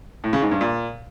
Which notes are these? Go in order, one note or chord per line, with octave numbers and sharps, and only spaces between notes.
A2
C#3
G#2
G2
A#2